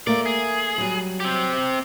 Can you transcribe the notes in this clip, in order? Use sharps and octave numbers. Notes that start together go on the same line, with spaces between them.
A3 A#3 A#4 D5
G#4
F#3 G3
C4 G4